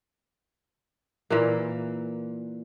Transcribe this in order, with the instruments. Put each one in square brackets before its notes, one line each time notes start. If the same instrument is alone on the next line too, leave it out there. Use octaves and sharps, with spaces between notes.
[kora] A#2 E3 A#3